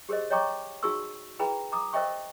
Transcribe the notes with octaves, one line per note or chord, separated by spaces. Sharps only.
G4 G#4 A#4 C5 D#5
C#5 D#5 G5 A#5 C#6 D6
D#4 F#4 G#4 A#4 C#6 E6
E4 G#4 B4 G5 A#5 B5
A#5 D6 D#6
A#4 C5 D#5 E5 G5 C#6